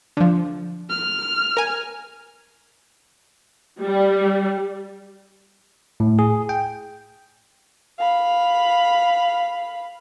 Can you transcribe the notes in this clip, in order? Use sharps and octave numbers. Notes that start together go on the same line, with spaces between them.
D3 F3
F6
A#4 G#5
G3
A2
G#4
G5
F5 B5